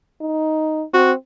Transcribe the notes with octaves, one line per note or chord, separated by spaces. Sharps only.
D#4
C4 F#4